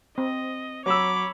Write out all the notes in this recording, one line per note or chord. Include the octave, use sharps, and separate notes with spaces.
C4 D#5
F#3 C#5 B5 D6 E6